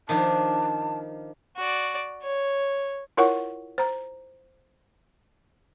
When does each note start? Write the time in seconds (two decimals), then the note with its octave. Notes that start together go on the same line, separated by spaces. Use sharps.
0.09 D#3 F3 D4 A5
1.57 F#4 D5
2.23 C#5
3.17 E4 F4 A#4 C#5 F#5 C#6
3.78 C5 A#5